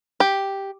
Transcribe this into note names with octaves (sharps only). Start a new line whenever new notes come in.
G4